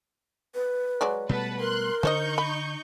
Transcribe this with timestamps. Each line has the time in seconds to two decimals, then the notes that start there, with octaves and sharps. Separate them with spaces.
0.55 B4
1.01 F#3 G#3 D5
1.29 B2 G3 A3 B4 F#5 A5
1.60 A#4 C6 F#6
2.03 D3 D#4 C5 C#5 D#5 C#6 G6
2.38 B5